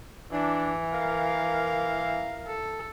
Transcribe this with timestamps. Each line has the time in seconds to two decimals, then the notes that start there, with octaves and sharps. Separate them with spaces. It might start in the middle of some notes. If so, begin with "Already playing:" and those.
0.32 E3 D4
0.94 A#4 F5
2.47 A4